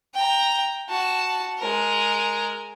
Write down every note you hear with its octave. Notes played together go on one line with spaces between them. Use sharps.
G5 A#5
F#4 A5
G#3 A#4